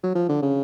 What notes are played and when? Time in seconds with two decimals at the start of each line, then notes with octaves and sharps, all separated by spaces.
0.03 F#3
0.15 F3
0.29 D3
0.42 C#3